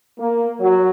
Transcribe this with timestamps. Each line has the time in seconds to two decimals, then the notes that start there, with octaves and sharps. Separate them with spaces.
0.19 A#3
0.61 F#3